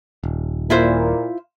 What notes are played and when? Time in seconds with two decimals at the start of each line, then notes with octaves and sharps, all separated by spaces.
0.23 D#1
0.70 A#2 E4 F4 C5